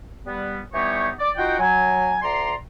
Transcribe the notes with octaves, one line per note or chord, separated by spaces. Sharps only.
G3 B3
E3 G3 B3 D#4 G4 C#5
D5
D#4 F4 F#4 F#5 G5
F#3 G#5
D2 D5 A#5 C6